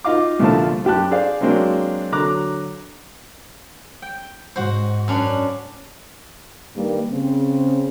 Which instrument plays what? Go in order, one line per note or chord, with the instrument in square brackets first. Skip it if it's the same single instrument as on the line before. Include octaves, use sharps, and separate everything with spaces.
[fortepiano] D#4 F4 D#5 F5 D6
C2 A#2 D3 F3 A5
F#2 G4 A5 F#6
G#4 C5 D5 F5
F#3 G#3 A#3 C4 D4
D3 F#3 A#5 D6 F#6
[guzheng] G5
[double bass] G#2 [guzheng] F#4 C5
[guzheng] F#2 C#4 D4
[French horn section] G2 D#3 G3 A#3
C#3 C4